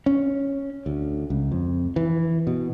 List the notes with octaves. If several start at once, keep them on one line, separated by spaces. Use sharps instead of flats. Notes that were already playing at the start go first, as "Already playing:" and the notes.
C#4
D2
C#2
F2
E3
B2